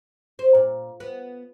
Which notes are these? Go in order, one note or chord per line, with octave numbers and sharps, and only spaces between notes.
C5
A#2
B3